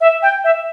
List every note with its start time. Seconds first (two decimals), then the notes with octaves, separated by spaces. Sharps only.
0.01 E5
0.22 G5
0.44 E5